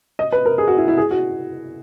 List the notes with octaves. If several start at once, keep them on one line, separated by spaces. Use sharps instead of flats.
D#5
B4
A#4
G#4
F#4
E4
E4
G#4
F#4